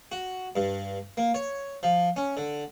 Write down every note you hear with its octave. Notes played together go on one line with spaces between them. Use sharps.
F#4
G2
A#3
C#5
F3
C#4
D3